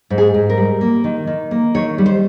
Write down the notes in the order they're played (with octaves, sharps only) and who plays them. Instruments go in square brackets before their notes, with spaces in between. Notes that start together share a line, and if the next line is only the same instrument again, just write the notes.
[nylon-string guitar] G#2
G#4
G#2
A#4
G3
A#3
D#3
D#3
A#3
D#3 C#5
G3
C5